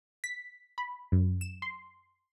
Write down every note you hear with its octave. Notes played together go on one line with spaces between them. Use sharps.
B6
B5
F#2
E7
C6